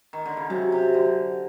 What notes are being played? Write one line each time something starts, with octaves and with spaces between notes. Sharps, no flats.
D#3
D3
C#3
C3 F#3
C3
D3